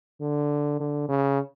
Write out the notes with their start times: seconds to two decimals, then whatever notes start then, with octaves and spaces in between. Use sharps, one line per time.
0.21 D3
0.80 D3
1.09 C#3